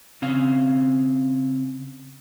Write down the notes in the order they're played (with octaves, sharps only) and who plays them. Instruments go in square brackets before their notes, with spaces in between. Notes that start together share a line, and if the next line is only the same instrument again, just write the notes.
[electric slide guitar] C#3 C4 F5